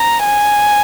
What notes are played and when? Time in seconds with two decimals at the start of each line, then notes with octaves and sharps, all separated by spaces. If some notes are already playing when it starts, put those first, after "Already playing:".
Already playing: A#5
0.24 G#5